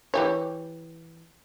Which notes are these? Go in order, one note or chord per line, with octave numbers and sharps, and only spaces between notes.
E3 G4 C#5